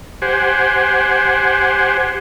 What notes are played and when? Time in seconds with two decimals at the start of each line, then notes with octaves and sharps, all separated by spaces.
0.22 G4 C5 F#5 G#5